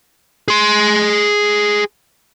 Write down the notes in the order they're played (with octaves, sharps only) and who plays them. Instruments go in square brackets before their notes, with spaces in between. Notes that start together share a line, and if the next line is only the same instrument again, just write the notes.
[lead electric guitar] G#4 C6